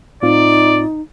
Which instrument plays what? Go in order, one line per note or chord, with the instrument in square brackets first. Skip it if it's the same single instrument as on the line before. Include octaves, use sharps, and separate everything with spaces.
[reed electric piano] A2 C4 F4 [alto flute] D#4 [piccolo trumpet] D5